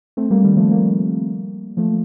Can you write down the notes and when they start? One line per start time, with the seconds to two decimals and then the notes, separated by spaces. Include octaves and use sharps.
0.17 A3 C4
0.30 G3 A#3
0.44 D#3 G3
0.57 F3 A3
0.71 G3 A#3
1.77 F3 A3